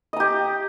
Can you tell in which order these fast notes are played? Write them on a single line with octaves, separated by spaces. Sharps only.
D#5 A#5 G4